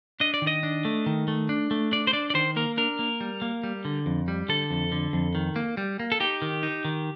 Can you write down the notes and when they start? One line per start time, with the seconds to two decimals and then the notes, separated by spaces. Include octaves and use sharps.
0.20 D4 D#5
0.34 D5
0.42 D#3
0.47 D#5
0.63 D4
0.85 A3
1.06 D#3
1.28 A3
1.49 D4
1.71 A3
1.92 D4 D5
2.07 C5
2.13 D4 D5
2.30 D5
2.35 D#3 C5
2.56 A#3 A#4
2.77 D4 A#4
2.99 A#3
3.21 G3
3.42 A#3
3.63 G3
3.85 D3
4.06 F2
4.28 G3
4.49 D3 A4
4.70 F2
4.92 D3
5.13 F2
5.35 D#3
5.56 A#3
5.77 G3
5.99 A#3
6.12 A4
6.20 D#4 G4
6.42 D#3
6.63 D#4
6.85 D#3